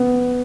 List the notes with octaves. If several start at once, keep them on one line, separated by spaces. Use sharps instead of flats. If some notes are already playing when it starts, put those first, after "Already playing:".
Already playing: B3